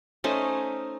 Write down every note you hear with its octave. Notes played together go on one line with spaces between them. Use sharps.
A3 C#4 D#4 C5